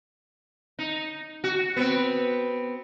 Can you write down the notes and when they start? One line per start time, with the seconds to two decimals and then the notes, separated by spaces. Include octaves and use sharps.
0.79 D#4
1.44 F#4
1.76 B3 C4